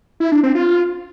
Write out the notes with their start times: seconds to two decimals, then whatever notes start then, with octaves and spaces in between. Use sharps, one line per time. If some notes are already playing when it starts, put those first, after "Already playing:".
0.20 E4
0.32 D4
0.43 C4
0.55 F4